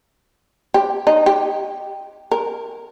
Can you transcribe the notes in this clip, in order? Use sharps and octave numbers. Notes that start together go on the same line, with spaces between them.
G4
D#4
G4
A#4